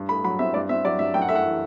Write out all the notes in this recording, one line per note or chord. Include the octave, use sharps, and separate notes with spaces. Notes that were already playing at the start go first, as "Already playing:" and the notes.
Already playing: G2
A3 B5
F#3 B5
C4 E5
G2 D5
C4 E5
F#3 D5
G2 E5
F#2 G5
F#5
A3 E5
F#5
E3